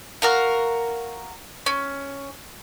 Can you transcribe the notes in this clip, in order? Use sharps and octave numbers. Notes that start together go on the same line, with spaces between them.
F#4 A#4 F5
C#4